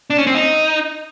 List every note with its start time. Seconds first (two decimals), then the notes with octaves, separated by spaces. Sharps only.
0.10 D4
0.18 C#4
0.27 C4
0.35 D#4